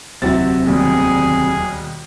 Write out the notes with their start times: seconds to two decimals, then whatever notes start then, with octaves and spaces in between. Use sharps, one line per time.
0.22 E1 D2 C3 F#3 C4 E4 F#4 A6
0.66 D#2 B2 G3 G#4